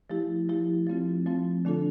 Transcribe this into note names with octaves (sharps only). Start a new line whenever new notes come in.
F3 A3 E4 G4
F3 A3 E4 G4
F3 A3 C4 F4
F3 A3 C4 F4
D3 A3 D4 F4 A4